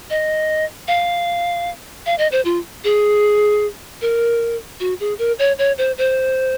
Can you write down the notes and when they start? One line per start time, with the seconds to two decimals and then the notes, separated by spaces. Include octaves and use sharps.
0.10 D#5
0.88 F5
2.06 F5
2.18 D#5
2.32 C5
2.45 F4
2.84 G#4
4.01 A#4
4.80 F#4
5.00 G#4
5.19 A#4
5.39 C#5
5.59 C#5
5.78 C5
5.98 C5